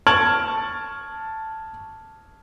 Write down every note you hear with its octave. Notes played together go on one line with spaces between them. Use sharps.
A5 C#6 F6 G#6 D7 F#7